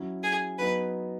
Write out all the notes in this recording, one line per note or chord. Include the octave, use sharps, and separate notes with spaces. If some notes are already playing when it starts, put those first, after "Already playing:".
Already playing: F#3 C#4 E4
G#4
F#3 B3 D#4 B4